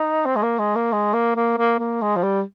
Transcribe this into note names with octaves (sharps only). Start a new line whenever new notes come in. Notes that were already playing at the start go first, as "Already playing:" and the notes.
Already playing: D#4
C4
G#3
A#3
G#3
A#3
G#3
A#3
A#3
A#3
A#3
G#3
F3
G3